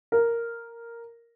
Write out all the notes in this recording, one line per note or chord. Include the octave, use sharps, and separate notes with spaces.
A#4